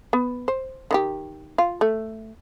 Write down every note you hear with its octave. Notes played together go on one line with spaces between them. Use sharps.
B3
C5
D#3 E4 G4
F4
A3